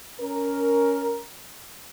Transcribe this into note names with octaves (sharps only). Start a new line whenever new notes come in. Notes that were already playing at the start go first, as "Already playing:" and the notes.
C#4 A#4